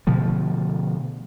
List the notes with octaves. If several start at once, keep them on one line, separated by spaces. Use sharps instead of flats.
B2 D3 F3 A3